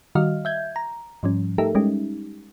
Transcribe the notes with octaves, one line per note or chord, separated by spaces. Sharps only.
D#3 G3 F#4 D#5 F5 F6
E5 G6 G#6
A#5
G#2 F3 G3 C#4
A3 D#4 G4 A4 A#4 E5
G3 G#3 C#4 D#4 G4